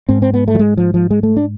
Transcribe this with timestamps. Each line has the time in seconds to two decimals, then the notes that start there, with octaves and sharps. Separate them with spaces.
0.09 G#2 C4
0.22 C4
0.34 B3
0.48 A3
0.55 F3
0.59 G#3
0.77 F3
0.94 F3
1.11 G#3
1.23 A3
1.37 D4